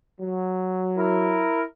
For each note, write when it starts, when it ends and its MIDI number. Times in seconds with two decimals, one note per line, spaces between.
0.21 1.51 54
0.97 1.62 64
0.97 1.62 70